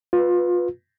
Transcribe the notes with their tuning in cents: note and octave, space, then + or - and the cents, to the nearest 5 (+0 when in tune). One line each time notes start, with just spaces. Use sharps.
F4 +25 B4 +0